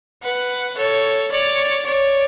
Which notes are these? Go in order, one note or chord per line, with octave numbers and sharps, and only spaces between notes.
B4 F#5
A4 C#5
C#5 D5
C#5 D5